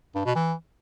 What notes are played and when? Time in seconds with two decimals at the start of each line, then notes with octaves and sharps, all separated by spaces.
0.15 G2
0.25 B2
0.35 E3